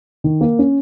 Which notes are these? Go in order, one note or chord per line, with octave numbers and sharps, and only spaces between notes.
D#3
A#3
C#4